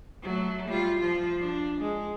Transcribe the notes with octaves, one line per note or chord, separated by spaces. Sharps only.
F#3 A3
G3 F4
F3 F4
D4
G#3